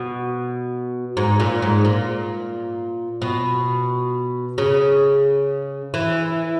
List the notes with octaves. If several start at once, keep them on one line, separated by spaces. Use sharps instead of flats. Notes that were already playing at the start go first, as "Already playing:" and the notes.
Already playing: B2
G#2
A#2
G#2
A#2
B2
C#3
E3